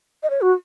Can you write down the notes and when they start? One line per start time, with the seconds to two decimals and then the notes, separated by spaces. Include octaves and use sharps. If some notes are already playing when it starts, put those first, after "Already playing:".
0.23 D#5
0.30 C#5
0.41 F#4